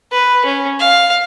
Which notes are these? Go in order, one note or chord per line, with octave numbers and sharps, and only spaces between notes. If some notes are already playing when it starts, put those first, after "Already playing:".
B4
C#4
F5